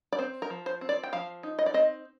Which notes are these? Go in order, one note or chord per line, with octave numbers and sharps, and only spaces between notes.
D5
C4 C5
A#4
F3
C5
C4
D5
G5
F3 F5
D#4
D#5
D5
C4 D#5